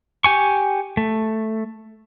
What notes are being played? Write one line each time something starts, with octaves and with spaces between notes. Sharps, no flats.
G4 G#5 C#6
A3